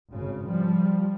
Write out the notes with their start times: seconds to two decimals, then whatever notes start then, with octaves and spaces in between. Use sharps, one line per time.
0.14 G#1 C#3
0.47 F3 G3